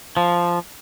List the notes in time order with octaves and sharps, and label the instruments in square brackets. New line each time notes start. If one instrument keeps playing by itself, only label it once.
[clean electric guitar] F3